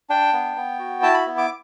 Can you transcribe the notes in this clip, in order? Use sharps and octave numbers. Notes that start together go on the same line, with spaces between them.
D4 G5
B3
B3
F#4
E4 A5
B5
B3
D6